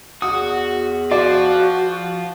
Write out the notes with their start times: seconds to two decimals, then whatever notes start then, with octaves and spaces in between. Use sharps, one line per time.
0.22 E2 F#4 D#6
1.11 F4 F#4 C5 D5